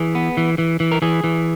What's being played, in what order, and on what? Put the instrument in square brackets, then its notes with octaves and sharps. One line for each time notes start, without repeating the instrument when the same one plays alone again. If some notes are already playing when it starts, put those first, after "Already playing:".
Already playing: [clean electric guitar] E3 G#4
B3
E3
E3
E3
A#4
E3 G#4
E3